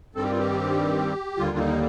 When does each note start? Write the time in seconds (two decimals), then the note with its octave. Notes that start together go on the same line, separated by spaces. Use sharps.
0.15 G2 D#3 G3 C4 A4
0.23 G4
0.31 F4
0.39 G4
1.37 D#2 D3 G3 A#3 F4
1.52 D4
1.58 D#4